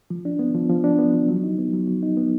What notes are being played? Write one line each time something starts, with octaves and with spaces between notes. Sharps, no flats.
F3
D4
B3
F3
F3
D4
B3
F3
F#3
D#4
B3
F#3
F#3
D#4
B3